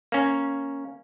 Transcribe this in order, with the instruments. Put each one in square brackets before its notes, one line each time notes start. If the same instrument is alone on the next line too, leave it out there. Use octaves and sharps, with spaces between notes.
[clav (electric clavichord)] A#3 C#4